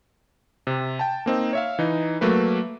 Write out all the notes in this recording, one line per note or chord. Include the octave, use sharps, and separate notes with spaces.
C3
G5 A5
A#3 C4 D#4
C#5 E5 F5
E3 D#4
F#3 A3 A#3 B4